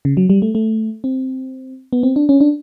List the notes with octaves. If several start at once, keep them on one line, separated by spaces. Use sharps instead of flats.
C#3
F#3
G3
A3
A3
C4
B3
C4
D4
C#4
D4